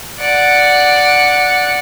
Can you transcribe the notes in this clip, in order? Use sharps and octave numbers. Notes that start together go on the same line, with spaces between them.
D5 F#5